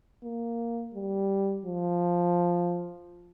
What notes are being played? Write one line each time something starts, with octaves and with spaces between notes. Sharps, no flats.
A#3
G3
F3